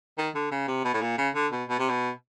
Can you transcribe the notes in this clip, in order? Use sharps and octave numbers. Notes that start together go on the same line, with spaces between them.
D#3
D3
C#3
C3
B2
A2
A#2
C#3
D3
B2
B2
C3
B2